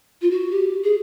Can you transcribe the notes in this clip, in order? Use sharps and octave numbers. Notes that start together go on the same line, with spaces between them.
F4
F#4
G4
G#4